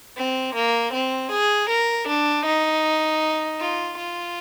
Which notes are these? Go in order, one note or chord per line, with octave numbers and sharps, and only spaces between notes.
C4
A#3
C4
G#4
A#4
D4
D#4
F4
F4